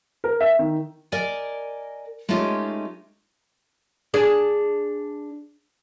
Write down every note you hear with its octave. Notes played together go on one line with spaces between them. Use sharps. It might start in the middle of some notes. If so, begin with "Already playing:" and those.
A#4
E5
D#3
A#4 D5 D#5 G#5
G#3 A3 C#4 D#4 F4 G4
D4 G#4 D5